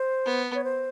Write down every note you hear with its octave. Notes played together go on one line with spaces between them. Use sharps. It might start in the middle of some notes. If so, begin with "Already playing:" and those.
Already playing: C5
B3
C#5
C5